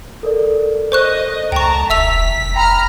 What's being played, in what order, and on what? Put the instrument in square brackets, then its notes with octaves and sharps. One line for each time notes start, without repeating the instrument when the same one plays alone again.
[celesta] A4 A#4 D5
[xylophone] C5 C#6 F#6 [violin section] D#5
[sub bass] C#2 [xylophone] G5 C#6 [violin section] A5 A#5
[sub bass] E1 [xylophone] E5 E6 F7 [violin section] B6
[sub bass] F1
[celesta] G5 B5 [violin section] A#5 F6